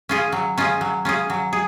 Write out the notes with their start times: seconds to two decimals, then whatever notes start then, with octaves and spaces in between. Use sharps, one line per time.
0.09 C#4 F4 G#4
0.32 F#3
0.57 C#4 F4 G#4
0.81 F#3
1.05 C#4 F4 G#4
1.30 F#3
1.53 G#4